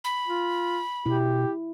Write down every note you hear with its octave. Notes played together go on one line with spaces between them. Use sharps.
B5
F4
B2 E4 G4